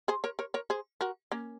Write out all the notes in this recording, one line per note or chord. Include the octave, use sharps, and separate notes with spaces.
G#4 C5
A#4 C#5
A#4 C#5
A#4 C#5
G#4 C5
F#4 A#4
A#3 C#4